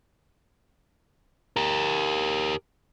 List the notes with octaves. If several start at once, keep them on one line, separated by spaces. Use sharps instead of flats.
G4 A#4